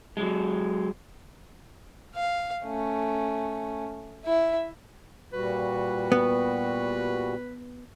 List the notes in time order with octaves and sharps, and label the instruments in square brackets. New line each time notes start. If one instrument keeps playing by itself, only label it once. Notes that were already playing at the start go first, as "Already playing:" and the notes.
[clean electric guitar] F#3 G#3
[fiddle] F5
A3 C#4
E4 E5
[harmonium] A#2 G3 F#4 [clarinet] B4
[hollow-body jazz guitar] B3